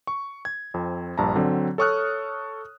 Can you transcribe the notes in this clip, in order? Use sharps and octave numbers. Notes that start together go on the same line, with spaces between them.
C#6
G#6
F2 C4
A#1 G2 A5 A#5
D3 F#3 C4
A4 C#5 C#6 D#6 F6 F#6